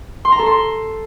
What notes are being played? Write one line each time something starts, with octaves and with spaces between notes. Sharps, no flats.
C6
A#5
A4
C6